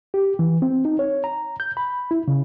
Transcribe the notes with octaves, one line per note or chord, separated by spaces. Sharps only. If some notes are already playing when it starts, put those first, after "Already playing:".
G4
E3
C4
D#4
C#5
A#5
G6
B5
E4
C#3